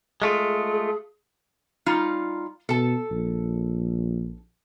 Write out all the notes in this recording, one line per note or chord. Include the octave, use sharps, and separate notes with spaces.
G#3 A3 F4 G#4
G3 D#4 F4
B2 A4 A5
A#1